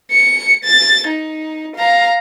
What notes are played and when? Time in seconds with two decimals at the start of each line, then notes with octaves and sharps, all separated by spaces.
0.12 C#7
0.65 A6
1.08 D#4
1.77 F5 A#5